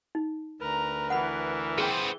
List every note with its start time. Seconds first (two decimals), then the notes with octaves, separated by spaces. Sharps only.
0.15 D#4
0.61 D2 A#4 B4 A#5
1.10 E3 F#5 B5
1.78 B3 G#4 C5 G5